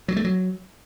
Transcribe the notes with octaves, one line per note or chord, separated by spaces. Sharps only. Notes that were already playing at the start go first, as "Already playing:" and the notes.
F#3
A3
F#3